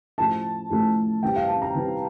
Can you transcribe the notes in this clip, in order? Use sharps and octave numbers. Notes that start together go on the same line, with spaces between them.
A2 F3 A3 A5
A2 F3 A3
C3 E3 G3 G5
F5
A5
A#5
C3 E3 G3